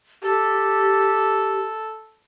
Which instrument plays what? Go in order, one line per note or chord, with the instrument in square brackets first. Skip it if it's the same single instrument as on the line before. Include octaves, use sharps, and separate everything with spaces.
[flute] G4 [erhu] A4